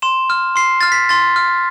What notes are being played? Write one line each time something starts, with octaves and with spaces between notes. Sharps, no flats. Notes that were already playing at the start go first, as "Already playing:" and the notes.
C6 E7
F6
C6 C7
F6 A6
B6
C6 A6
F6